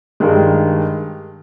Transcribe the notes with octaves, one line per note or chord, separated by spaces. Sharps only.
G2 D#3 G#3